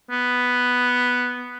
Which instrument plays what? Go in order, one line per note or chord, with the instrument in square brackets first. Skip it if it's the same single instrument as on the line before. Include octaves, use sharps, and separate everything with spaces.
[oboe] B3